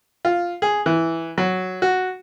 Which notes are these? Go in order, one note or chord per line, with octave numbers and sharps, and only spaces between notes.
F4
G#4
E3
F#3
F#4